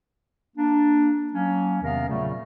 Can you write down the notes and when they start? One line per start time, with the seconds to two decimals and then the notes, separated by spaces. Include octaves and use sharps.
0.57 A#3 D4
1.32 F#3 A#3 C#4
1.82 E2 C3 D#3 B3 A#4 F5
2.08 A#2 C#3 F#3 G3 A3